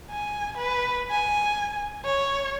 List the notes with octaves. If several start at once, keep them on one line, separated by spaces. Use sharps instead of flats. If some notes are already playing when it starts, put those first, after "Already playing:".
G#5
B4
G#5
C#5